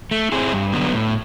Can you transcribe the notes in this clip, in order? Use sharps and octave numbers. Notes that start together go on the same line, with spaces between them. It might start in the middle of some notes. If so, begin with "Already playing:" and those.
A3
C4 E4 G#4
G2
D3 F#3 B3
A2